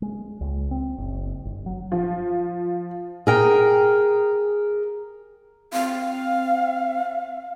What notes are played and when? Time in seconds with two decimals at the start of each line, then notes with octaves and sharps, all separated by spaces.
0.02 G#3
0.41 C#2
0.71 C4
0.98 F#1
1.45 G1
1.66 F#3
1.92 F3
3.27 G#4 A#4 G5
5.73 C4 F5